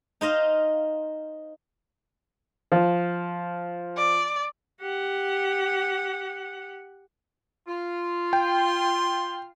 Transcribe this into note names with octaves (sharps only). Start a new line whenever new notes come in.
D#4 C5 D#5 F5
F3
D5
G4 F#5
F4
G5 C6